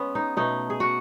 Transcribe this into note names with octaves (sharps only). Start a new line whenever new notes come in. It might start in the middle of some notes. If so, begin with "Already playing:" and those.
Already playing: G#3 B3 C#4
D#4
B2 A3 D#4
G#4
F#4